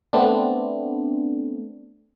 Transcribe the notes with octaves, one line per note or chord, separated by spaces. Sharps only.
A3 B3 C4 D4